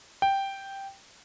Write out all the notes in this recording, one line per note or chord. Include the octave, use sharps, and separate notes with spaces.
G5